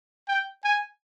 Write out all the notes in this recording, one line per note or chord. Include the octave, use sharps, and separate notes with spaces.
G5
G#5